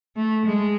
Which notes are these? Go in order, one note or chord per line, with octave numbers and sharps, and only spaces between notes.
A3
G#3